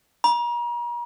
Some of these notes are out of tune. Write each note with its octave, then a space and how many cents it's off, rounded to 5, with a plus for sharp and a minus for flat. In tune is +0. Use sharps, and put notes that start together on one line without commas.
A#5 +40